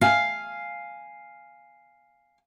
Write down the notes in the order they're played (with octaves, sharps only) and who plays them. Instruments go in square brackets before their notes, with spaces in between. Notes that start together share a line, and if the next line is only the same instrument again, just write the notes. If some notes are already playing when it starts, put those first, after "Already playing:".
[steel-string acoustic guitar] F5 G#5